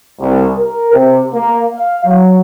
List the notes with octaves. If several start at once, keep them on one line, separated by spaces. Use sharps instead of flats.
C2
A#4
C3
A#3
F5
F#3